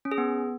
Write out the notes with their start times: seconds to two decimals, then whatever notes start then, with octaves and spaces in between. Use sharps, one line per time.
0.05 C#4
0.11 G#4
0.18 B3